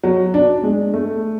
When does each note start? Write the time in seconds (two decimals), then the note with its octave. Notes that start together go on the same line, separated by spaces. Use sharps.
0.03 F#3
0.34 D4
0.63 G#3
0.94 A3